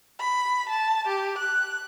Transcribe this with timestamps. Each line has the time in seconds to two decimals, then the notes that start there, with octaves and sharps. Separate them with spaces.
0.19 B5
0.69 A5
1.07 G4
1.37 F#6